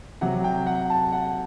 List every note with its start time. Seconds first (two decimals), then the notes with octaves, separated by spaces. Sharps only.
0.21 C3 F#3 F#5
0.44 G5
0.67 F#5
0.90 A5
1.12 F#5